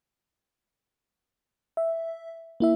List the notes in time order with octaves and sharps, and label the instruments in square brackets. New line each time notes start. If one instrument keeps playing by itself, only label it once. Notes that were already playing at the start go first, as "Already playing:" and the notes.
[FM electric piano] E5
A#3 E4 E5